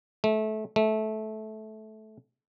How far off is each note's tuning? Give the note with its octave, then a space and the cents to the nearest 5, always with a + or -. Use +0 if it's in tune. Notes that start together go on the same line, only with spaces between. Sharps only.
A3 -25
A3 -20